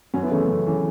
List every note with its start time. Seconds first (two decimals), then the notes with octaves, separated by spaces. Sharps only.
0.14 F#2 C#4 F#4
0.23 B3 E4
0.31 C#3 E3 A3
0.48 F#2
0.66 C#3 E3